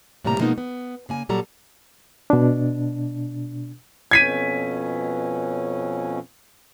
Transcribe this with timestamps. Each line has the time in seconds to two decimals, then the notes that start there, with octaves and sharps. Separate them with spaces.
0.24 A2 C3 G3 A#3 A#5
0.39 B2 F3 G#3 A#3 B3 D#4
0.58 B3
1.09 C#3 A#3 G#5
1.29 A#2 F#3 G3 A4 A#5
2.30 B2 D4
4.11 F2 B2 C#4 G#6 B6 D#7